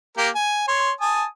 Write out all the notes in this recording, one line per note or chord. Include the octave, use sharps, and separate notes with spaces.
A#3 G4 A#4
G#5
C#5 C6
G#5 A5 D#6